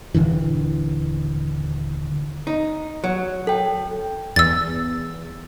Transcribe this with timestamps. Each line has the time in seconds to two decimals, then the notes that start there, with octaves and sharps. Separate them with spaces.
0.15 D#1 C2 D3 E3
2.47 D#4
3.04 F#3
3.47 A4 G5
4.36 E2 E6 A6